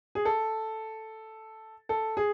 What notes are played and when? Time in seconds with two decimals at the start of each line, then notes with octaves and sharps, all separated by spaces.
0.15 G#4
0.25 A4
1.89 A4
2.17 G#4